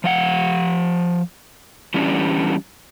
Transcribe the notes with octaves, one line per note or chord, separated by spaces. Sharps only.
F3 F5 F#5
E3 G3 C#4 D4